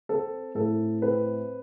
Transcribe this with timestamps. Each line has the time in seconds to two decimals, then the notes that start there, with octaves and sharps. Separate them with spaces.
0.09 C4 A4
0.55 A2 A4
1.02 C4 B4